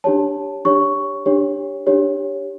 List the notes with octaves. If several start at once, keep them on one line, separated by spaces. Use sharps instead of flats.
D4 G4 C#5 A5
D4 G4 C#5 C#6
D4 G4 C#5
D4 G4 C#5